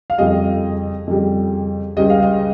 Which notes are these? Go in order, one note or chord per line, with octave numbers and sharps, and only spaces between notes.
F5
F2 C#3 G3 D#5
F2 C#3 G3
C#2 C#3 G3 D#5
F5
D#5